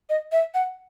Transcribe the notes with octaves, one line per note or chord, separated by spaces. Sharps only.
D#5
E5
F#5